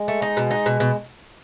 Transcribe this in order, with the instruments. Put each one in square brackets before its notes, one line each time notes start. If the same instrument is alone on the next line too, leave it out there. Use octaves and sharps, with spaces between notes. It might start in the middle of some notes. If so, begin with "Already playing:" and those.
Already playing: [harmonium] G#3
[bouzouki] A3
D#4
B2
D#4
B2
B2